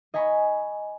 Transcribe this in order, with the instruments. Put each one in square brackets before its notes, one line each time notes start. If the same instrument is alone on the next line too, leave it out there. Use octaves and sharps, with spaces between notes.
[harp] D#5 G#5 A#5 B5 C#6